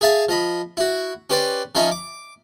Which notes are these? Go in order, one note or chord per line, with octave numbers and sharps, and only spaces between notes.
G#4 E5 F5 A5
F3 D#5 B5
E4 F#4
C#4 G4 B4 C5 D5
F3 C#4 D#4 F4 C#5 E5
D6